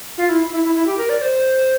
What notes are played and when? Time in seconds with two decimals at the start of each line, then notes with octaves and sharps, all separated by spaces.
0.18 F4
0.29 E4
0.53 E4
0.64 E4
0.75 E4
0.86 G4
0.98 A#4
1.09 D5
1.22 C5